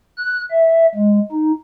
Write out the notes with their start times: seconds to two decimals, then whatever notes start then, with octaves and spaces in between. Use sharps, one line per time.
0.17 F#6
0.51 E5
0.95 G#3
1.32 D#4